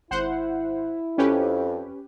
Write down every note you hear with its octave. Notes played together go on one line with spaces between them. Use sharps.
G#1 E4 C5 F#5
F2 C#4 G4 B4